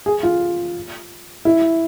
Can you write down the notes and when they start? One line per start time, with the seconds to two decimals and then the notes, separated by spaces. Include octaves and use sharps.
0.06 G#4
0.23 F4
1.45 E4